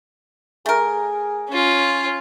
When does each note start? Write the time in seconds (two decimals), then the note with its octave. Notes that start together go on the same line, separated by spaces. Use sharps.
0.66 A3 G#4 A#4
1.49 C#4 F4